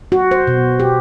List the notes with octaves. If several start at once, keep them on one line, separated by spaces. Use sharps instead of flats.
F#4
C5
B2
G4